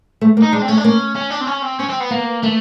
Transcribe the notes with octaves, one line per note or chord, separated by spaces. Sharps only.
A3
A#3
D#4
G#3 D4
C4
A3 C#4
D4
A#3 C#4
C#4
D4
C4
C#4
C4
C4 C#4
C4
B3
A#3 B3
A3 A#3